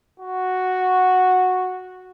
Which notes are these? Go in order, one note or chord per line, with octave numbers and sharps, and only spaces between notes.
F#4